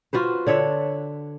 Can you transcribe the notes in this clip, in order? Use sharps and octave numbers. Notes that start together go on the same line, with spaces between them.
F4 F#4 B4 C5
D3 D4 C#5 E5